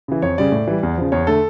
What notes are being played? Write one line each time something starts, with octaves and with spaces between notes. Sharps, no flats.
C#3 E3
F2 C#5
C#3 G3 D5
A2
E3 G3
E2
C#3 F3
E2 C#5
D3 A3 A4